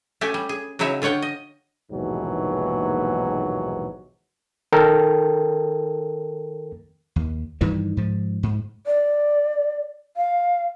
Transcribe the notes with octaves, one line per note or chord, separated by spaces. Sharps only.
A3 C#4 F#4 G4 G#5
G3
G#4
C#3 F#3 D#4 E4 C#5 E5
D3 F4 C#5 F#5 G5
D#5
A#1 D#2 G#2 B2 E3 F#3
D#3 A4 A#4 G5
D#2
G2 D#3 E3 G3
G#2 F3
G#2
D5
F5